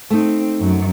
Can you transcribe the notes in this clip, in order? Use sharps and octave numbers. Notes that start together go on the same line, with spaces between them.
A3 C4 D#4
F#2 F#3